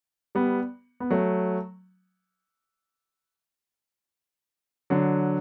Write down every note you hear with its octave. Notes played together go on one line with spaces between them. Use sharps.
G3 B3
B3
F#3 A3
D3 F#3